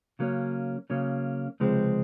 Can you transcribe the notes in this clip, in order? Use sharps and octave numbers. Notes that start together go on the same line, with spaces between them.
C#3 F#3 A#3 C#4
C#3 F#3 A#3 C#4
C#2 C3 F3 G#3 C4